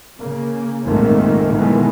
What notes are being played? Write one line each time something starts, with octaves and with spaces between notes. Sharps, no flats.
C#3 A#3
A#1 F2 G#2 D#3 A3 A#3
B2 D#3 E3 F#3 G#3 A3